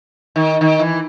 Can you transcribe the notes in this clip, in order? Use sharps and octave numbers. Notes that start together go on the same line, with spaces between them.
D#3
D#3
E3